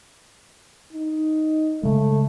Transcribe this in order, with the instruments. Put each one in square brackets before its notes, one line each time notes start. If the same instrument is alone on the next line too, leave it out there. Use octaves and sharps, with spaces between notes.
[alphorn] D#4
[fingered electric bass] C#3 G#3 [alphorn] A3